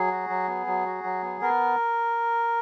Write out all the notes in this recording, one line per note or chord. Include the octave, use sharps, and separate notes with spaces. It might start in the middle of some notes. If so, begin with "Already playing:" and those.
Already playing: F#3 G#4
F#4
F#3
B3
F#3
F#4
F#3
B3
B3 A#4